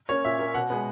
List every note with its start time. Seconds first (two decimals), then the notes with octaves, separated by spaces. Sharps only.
0.09 A#3 C#4 C#5
0.25 A#2 E5
0.39 A#3 C#4
0.54 B2 F#5
0.70 G#3 B3